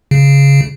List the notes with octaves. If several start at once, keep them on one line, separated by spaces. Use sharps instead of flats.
C#3